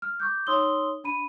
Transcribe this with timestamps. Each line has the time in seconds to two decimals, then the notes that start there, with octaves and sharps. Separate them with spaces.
0.02 F6
0.20 C#6 D6 G6
0.47 D#4 C#5 C6 D#6 E6 G7
1.04 D4 B5 D#7